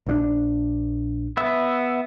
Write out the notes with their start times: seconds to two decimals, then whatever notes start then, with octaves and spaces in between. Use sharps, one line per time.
0.06 A#1 D3 D4
1.37 B3 E5